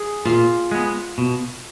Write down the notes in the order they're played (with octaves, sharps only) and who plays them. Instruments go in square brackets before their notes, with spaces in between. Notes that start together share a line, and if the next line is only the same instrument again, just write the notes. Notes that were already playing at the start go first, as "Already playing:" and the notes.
Already playing: [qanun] G#4
[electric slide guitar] A#2 [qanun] F4
[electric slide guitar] G#3 B3
B2